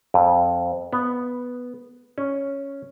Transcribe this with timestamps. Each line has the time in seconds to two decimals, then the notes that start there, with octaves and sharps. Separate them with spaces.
0.14 F2
0.93 B3
2.18 C#4